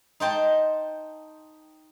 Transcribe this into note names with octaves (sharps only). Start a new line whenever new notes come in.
D#4 C5 G5 A5